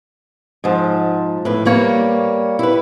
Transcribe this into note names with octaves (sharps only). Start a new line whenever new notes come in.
G#2 F3
A2 B4
G3 A#3 C#5
E4 B4